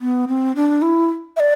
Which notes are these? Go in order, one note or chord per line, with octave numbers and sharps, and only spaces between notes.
B3
C4
D4
E4
E5
D5